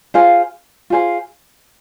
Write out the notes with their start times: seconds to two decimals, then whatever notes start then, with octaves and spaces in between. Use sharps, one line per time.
0.14 F4 G#4 C5 F5
0.90 F4 G#4 C5 F5